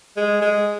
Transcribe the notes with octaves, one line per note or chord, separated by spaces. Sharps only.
G#3
G#3